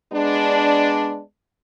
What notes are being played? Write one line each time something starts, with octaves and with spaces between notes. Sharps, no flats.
G#3 B3 D4